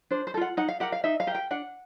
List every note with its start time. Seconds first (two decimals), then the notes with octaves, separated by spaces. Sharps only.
0.11 D4 C5
0.27 C5
0.34 A4
0.37 F4 F#5
0.57 D#4 F#5
0.68 F5
0.80 G4 A#4 F#5
0.92 F5
1.04 D#4 E5
1.20 F5
1.27 G4 A#4
1.35 G5
1.51 D4 F#5